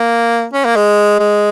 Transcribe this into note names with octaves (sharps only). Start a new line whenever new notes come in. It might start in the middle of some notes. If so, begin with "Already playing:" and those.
Already playing: A#3
C#4
A#3
G#3
G#3